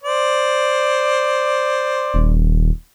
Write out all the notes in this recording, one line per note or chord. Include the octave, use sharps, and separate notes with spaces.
C5 D5
D#1